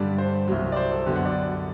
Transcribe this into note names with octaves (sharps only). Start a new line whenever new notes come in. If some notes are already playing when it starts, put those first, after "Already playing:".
Already playing: G2 D3 G3 D5
C5
C2 C3 F#3
D5
C5
A4
F#2 D3 F#3 B3 G4
F#5
D5